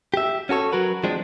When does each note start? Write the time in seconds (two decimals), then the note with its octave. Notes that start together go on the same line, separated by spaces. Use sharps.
0.14 G4 E5
0.49 C#4 F#4 A4 C#5
0.72 F#3 F#4 A#4 B4
1.03 F3 G#3 C4 D4